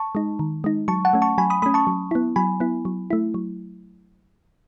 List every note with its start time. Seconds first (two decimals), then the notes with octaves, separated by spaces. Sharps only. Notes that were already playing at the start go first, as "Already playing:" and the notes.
Already playing: A5 C#6
0.15 G#3 D#4
0.39 D#3
0.64 G#3 D#4
0.88 F#3 A5 C#6
1.05 F#5 A5
1.13 A3 C#4
1.22 A5 C#6
1.38 F#3 G#5 B5
1.50 B5 D#6
1.62 A3 C#4 B5 D#6
1.74 A5 C#6
1.87 F#3
2.11 B3 E4
2.36 F#3 G#5 B5
2.60 B3 E4
2.85 F#3
3.10 A3 E4
3.34 F#3